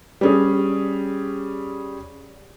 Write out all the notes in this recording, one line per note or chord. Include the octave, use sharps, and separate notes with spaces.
G3 C#4 G#4